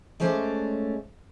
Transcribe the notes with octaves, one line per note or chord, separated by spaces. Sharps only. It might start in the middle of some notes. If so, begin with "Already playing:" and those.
G#3 A3 C#4 C5 D5